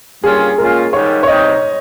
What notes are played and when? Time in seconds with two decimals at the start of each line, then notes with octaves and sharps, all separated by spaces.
0.23 G2 G3 A#3 C#4 F4 G#4
0.58 A#2 G#3 C#4 F4 A#4
0.93 G#2 D#3 G3 C#5
1.23 C#5
1.27 C3 G3 C4 D#4 D#5